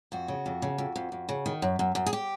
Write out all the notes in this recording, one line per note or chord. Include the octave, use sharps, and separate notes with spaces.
F2 F#4
C#3
F2
C#3
F2
F2
F2
C#3
D#3
F#2
F#2
F#2
G#4
G4